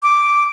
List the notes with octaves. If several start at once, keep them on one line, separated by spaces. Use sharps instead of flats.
D6